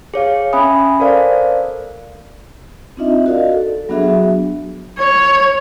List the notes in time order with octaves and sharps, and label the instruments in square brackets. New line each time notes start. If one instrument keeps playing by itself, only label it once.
[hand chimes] G#4 C#5 F5
C#4 E5 G#5 B5 D#6
A4 A#4 C5 D5 F5
[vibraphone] C4 D4 D#4 F4 D#5 E5
F#4 A#4 D5 D#5 F5
A4
F#3 B3 D4 F#4 G#4 E5
[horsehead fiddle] C#5